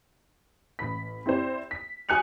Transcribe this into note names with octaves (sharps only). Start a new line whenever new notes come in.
A1 B5 B6
C4 E4 G4 C5 D5
B6
F#4 G#5 D#6 F#6 C#7 F7